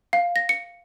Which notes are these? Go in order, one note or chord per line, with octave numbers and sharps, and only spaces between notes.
F5
A#6
C#7